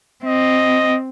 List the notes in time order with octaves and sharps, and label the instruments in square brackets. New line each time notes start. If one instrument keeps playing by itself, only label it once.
[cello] C4 [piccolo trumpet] D#5